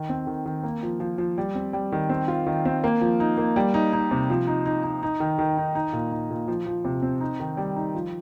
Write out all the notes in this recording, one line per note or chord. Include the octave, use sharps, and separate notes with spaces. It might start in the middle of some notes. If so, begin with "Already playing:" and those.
Already playing: D#3
C4
D#3
D#3
A#3
F3
F3
F3
G3
C4
G3
D#3
C4
F4
D#3
C4
A#3
F3
D#4
A#3
G3
D#4
D#4
C3
F3
D#4
D#4
D#4
D#4
D#3
D#3
D#4
D#4
A#2
D#4
A#2
F3
F3
C3
C4
D#4
D#3
G3
D#4
F3